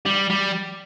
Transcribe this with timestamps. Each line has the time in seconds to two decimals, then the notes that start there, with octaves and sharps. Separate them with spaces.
0.06 G3
0.30 G3